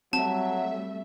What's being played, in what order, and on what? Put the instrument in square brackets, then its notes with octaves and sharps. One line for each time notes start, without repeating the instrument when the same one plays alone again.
[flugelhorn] F#3 [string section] G3 A3 E5 [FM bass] C4 [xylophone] A5